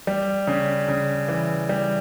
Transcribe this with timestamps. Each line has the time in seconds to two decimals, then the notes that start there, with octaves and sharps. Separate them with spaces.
0.07 G3
0.47 C#3
0.88 C#3
1.28 E3
1.69 G3